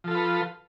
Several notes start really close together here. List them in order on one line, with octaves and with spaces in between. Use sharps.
F3 A4 F4 B4